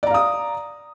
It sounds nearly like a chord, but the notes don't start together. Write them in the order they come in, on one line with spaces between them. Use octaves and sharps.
D5 A#5 F5 D#6